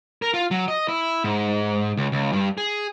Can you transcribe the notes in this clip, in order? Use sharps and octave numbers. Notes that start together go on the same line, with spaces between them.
A#4
F4
F#3
D#5
E4
G#2
C#2
C#2
G2
G#4